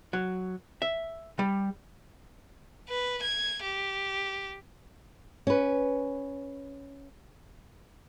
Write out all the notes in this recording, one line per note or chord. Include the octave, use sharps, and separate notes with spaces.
F#3
E5
G3
B4
G#6
G4
C#4 B4